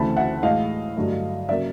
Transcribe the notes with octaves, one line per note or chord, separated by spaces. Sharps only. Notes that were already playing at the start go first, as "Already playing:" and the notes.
Already playing: D2 C#3 E3 A3 C4 A5 B5
E5 F#5
A2 E3 G#3 D#5 F5
G2 D3 F#3 A3
C#3 F#3 A#3 D5 E5